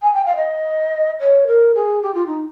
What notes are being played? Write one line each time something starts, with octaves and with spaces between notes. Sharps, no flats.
G#5
G5
F5
D#5
C#5
A#4
G#4
G4
F4
D#4